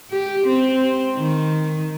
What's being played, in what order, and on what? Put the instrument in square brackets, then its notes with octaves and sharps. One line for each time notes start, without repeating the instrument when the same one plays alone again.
[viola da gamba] G4
C4
D#3